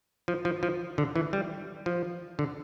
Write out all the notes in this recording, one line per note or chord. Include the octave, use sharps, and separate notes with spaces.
F3
F3
F3
D3
E3
G3
F3
D3